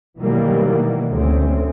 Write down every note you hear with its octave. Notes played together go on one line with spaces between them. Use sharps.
B2 D#3 E3 F#3 G3 A#3
D2 C4 C#4